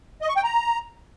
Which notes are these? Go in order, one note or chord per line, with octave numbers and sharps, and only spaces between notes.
D#5
C#6
G5
A#5